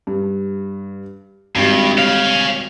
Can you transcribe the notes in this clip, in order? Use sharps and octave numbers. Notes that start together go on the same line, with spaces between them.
G2
G#1 G2 G3
C#5 F5